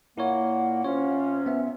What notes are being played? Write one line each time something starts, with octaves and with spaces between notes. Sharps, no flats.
A#2 A#3 E4 A#4 C#5 F#5
C3 C#4 F4 C#5
B3 E5